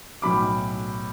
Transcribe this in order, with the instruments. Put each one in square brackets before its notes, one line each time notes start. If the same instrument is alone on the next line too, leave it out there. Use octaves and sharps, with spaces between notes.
[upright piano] B1 A2 F#3 B5 D6